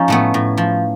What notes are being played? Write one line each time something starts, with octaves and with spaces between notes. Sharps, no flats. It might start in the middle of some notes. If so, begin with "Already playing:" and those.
Already playing: F3 C#4 D#4
A2 A3 B3
A2
F3